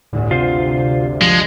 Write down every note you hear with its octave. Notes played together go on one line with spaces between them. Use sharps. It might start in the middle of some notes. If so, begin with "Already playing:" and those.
G1 D2 A2
C3 F4 C5
F3 G#3